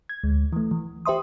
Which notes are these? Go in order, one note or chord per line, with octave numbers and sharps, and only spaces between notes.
G#6
D2 G#3
E3 A3
E3
G4 C5 E5 C6 D#6